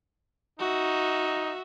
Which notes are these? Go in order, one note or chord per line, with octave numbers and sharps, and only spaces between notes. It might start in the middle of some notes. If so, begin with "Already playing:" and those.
D#4 F#4 E5